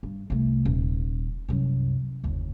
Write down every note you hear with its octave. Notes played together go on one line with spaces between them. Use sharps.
G2
C2 A3
D#1
C2 F#2
F#1 D#2